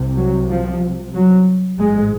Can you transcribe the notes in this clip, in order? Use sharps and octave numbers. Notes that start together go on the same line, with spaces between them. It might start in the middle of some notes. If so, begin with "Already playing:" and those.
Already playing: C2 C3
F#3
F3
F#3
A1 G#2 G#3